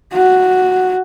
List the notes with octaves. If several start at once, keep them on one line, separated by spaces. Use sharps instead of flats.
F#4